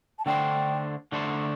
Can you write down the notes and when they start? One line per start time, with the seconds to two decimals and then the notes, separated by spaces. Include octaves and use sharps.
0.19 A5
0.26 D3 A3 D4 A4 C5 G5
1.12 D3 A3 D4 A4 C5